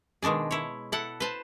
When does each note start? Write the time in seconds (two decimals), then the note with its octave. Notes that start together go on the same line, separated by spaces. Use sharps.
0.22 B2 D#3 G#3 D4 G#4
0.51 E4 C#5
0.92 E4 A4 F#5
1.20 B4 C5 A5